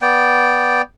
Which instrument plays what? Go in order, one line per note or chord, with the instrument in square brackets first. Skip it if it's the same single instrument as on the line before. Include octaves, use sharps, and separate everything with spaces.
[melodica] B3 D5 G5